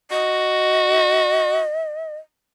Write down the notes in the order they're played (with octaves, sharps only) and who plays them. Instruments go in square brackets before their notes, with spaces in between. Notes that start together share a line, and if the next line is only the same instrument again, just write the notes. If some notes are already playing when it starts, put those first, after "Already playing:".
[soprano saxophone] F#4 [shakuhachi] D#5